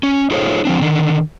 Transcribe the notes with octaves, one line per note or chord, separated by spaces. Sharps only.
C#4
D#4 F4 G#4 A4 C5 C#5
F3 C4 D4
D3 D#3